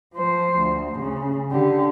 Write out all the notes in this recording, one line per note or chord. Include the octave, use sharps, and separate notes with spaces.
F3 C5
D2
C#3
D3 G4